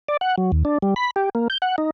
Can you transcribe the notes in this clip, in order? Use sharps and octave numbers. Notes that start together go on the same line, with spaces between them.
D5
F#5
F#3
D#2
D4
G3
B5
G4
A#3
G6
F#5
D#4